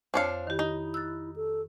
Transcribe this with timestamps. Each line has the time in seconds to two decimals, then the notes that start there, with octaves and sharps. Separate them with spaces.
0.14 F2 C4 D4 C#5 F5
0.47 D#3 E4 G4
0.59 D#4
0.94 E6 F#6 A6
1.36 A4